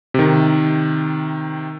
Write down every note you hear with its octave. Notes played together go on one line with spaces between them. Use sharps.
C3 D#3